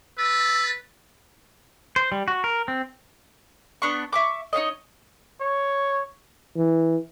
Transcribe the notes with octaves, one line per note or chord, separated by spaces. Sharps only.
B4 E6 A6
C5
G3
F#4
A#4
C4
B3 D4 C#6
E5 C#6 D6
D#4 F4 C#5 D#5
C#5
E3